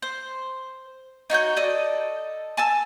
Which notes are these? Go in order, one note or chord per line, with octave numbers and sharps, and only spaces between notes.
C5
D#4 F#4 C#5 G6
A4 D5 D#5
G#5 A5 E6